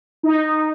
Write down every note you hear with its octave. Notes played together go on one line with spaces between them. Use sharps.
D#4